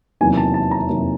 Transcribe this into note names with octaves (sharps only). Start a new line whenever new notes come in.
E2 C3 D#3 F#3 A#3 G#5
A5
A5
A#5
C3 D#3 F#3 A#3